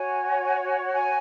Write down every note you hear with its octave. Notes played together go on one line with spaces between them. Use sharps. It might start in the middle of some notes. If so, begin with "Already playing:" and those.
Already playing: F#4 C#5 G#5
G#5